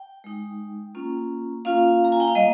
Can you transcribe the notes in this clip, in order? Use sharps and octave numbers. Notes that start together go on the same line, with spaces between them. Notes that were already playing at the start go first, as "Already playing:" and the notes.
Already playing: G5
G#3 D#4
A#3 C#4 F4
A#3 C#4 F4 F5
A#5
G#5
G5
F5
G3 A#3 D#5